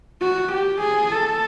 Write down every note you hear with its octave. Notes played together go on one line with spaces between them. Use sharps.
F#4
G4
G#4
A4